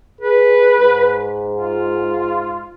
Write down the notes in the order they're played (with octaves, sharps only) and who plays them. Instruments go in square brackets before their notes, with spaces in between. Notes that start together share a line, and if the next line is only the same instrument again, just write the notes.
[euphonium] G#4 [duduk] B4
[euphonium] G#2
[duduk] F4